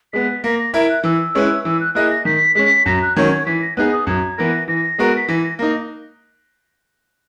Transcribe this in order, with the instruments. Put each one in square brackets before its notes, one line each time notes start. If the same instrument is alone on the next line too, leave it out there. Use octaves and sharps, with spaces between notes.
[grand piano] G#3 B3 [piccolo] B6
[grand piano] A#3 [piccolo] A#6
[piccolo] A#6
[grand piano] E4 A#4 E5 [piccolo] G#6
[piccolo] F#6
[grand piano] E3 [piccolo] E6
[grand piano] G#3 C#4 E4 B4
[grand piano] E3 [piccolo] E6
[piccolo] F#6
[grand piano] A#3 E4 G#4 D#5 [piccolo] F#6
[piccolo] A#6
[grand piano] D#3 [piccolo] B6
[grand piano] G#3 C#4 [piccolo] B6
[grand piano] F#2 [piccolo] A#6
[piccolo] F#6
[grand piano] D#3 F#3 C#4 [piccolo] G#6
[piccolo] G#6
[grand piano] E3 [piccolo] B6
[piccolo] A#6
[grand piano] B3 D#4 G#4 [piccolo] F#6
[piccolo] D#6
[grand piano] F#2 [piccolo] G#6
[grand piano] E3 B3 E4 A#4 [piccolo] A#6
[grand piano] E3 [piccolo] A#6
[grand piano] G#3 B3 F#4 A#4
[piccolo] B6
[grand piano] E3 [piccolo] A#6
[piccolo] A#6
[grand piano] A#3 D#4 [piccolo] A#6